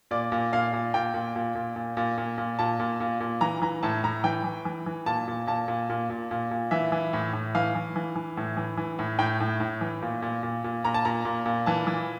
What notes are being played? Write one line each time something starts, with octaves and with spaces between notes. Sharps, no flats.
A#2 D5
A#2
A#2 F5
A#2
A#2 G5
A#2
A#2
A#2
A#2
A#2
A#2
A#2
A#2 A5
A#2
A#2
A#2
E3 A#5
E3 A#5
A2 A5
A2 A#5
E3 G5
E3
E3
E3
A#2 A5
A#2
A#2 A5
A#2
A#2
A#2
A#2
A#2
E3 E5
E3
A2
A2
E3 F5
E3
E3
E3
A2
E3
E3
A2
A2 G5
A2
A2
E3
A#2
A#2
A#2
A#2
A#2 A#5
A5
A#2 A#5
A#2
A#2
E3 A5
E3